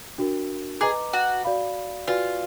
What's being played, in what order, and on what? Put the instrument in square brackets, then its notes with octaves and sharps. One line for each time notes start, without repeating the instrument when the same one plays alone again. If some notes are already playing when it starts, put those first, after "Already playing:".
[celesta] D4 F#4 A#4
[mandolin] G#4 [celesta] B4 D#5 A#5 D6
[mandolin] F#4
[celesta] F#4 D5 F5 B5
[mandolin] F4 [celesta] F#4 B4 D5 G#5